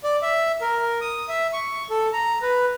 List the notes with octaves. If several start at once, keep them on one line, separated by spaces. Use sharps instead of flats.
D5
E5
A#4
D#6
E5
C#6
A4
A#5
B4